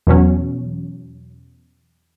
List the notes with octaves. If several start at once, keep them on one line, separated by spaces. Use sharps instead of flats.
E2 B2 F#3 C#4